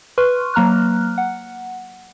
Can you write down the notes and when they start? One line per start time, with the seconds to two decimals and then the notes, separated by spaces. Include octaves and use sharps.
0.18 B4 C6 C#6 F6 F#6
0.54 F#3 A#3 A#5 F6 F#6
1.18 F#5